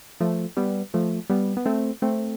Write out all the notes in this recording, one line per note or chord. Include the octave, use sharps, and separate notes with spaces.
F3 A3
G3 B3
F3 A3
G3 B3
B3
A3 C4
A3 C4